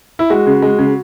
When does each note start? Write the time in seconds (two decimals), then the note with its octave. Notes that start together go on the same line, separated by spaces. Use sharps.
0.19 E4
0.30 G#3 F#4
0.47 C#3
0.62 G#3
0.79 C#3